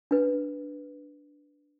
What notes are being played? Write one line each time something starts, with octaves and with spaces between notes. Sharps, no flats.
D4 B4